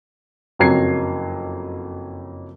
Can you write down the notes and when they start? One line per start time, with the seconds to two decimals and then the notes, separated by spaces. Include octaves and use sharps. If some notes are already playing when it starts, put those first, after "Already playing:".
0.59 F#1 F2 F#3 A#5 G#6 C7